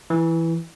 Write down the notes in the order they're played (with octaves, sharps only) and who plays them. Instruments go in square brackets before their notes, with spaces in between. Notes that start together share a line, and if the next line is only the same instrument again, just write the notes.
[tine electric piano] E3